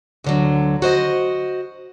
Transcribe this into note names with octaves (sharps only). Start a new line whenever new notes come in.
D2 D3 F#3
F#4 C5 D#5